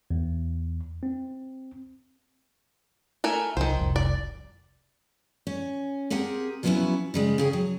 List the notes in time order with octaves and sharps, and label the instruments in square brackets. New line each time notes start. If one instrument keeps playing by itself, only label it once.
[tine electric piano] E2
C4
[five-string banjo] A3 A#4 G#5
[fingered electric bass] C2 F3 [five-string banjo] D#3 C5
[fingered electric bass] F1 C2
[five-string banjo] D5
[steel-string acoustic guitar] C#4
C4 G4 G#4 A#4 F#5
F3 F#3 B3 C#4 E4 F#4
C#3 G3 G#3
C#3 G#4 G5
F#3